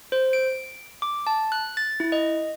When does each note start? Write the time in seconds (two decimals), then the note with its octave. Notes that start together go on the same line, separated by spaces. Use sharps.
0.12 C5
0.33 D7
1.02 D6
1.27 A5
1.52 F#6
1.77 A6
2.00 E4
2.12 D#5